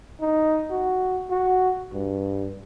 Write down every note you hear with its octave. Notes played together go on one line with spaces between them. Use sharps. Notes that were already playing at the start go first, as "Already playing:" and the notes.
D#4
F#4
F#4
G2